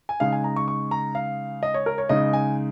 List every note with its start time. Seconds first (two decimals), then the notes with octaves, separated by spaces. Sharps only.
0.09 G#5
0.20 C#3 G#3 D#4 F5
0.32 G#5
0.44 A#5
0.56 C#6
0.68 C#6
0.91 A#5
1.15 F5
1.63 D#5
1.74 C#5
1.86 A#4
1.98 C#5
2.09 C#3 G#3 D#4 D#5
2.33 G#5